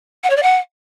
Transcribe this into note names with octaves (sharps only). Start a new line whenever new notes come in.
F#5
C#5
D5
F#5